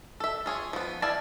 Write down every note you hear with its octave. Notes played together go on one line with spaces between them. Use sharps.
A4 E5
F4 G#4 C#5
F3 B3
E4 G#4 D5 F5 A5